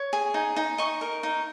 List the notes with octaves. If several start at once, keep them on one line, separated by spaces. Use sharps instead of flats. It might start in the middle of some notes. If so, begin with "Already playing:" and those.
Already playing: C#5
G#4
D#4
D#4
D#5 C#6
A#4
D#4